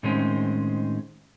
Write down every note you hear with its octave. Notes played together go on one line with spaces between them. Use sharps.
A2 D#3 G#3 C4 C#4 D#4